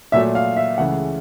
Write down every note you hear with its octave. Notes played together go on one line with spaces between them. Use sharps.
A#2 F#3 A3 E5
F5
E5
C#2 C#3 E3 A3 F#5